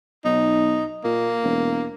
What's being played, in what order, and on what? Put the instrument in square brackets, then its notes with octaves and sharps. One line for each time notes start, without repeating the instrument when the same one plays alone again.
[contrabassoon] B1 [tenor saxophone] D#4
[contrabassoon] A#2 [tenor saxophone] A#3
[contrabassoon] E1